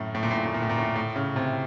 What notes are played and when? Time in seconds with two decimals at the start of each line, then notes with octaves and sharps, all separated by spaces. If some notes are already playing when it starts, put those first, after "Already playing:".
Already playing: F#2 A2
0.15 A2
0.23 A#2
0.31 A2
0.38 A#2
0.46 A2
0.54 A#2
0.62 A2
0.69 A#2
0.78 A2
0.96 A2
1.16 C#3
1.36 C3